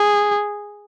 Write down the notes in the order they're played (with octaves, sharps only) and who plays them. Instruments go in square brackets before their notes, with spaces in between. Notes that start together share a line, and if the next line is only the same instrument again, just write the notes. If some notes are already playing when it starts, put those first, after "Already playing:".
Already playing: [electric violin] G#4